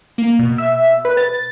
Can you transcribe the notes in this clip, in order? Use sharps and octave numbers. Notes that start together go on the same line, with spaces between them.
A#3
B2
E5
B4
A6